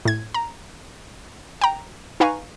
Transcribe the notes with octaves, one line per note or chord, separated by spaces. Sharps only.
A2 G#6
A#5
G5 A#5
D#4 B4 F5 G#5 A#5 C#6